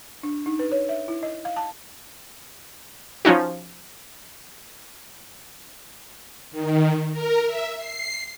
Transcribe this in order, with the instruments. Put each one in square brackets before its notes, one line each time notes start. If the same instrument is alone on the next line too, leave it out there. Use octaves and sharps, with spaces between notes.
[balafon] D4
D#4
B4
C#5
E5
E4
D#5
F5
A5
[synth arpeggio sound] F3 C#4 D#4 F#4
[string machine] D#3
A#4
E5
C7